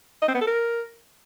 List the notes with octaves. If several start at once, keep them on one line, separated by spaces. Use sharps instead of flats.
D#5
C4
B3
A4
A#4